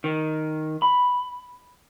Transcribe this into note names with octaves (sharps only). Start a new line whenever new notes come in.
D#3
B5